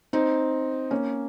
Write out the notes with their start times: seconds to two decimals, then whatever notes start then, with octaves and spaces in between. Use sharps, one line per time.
0.13 C4 D#4
0.91 A#3 C#4